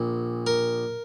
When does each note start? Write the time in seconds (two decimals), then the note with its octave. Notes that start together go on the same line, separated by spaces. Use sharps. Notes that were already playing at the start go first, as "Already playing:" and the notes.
Already playing: A#1 A#2
0.47 A#4